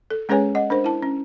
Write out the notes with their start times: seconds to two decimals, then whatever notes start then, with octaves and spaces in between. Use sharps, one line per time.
0.11 A4
0.29 G#3 C#4 G#4 B4 C#5 G#5
0.55 D#5 F#5
0.70 D4 A#4 C5
0.84 E4 A5
1.03 C#4